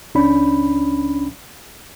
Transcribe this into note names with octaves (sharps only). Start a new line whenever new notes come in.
C#2 C#4 D4 B5